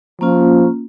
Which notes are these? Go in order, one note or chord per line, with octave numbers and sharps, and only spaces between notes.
F3 A#3 C#4 F4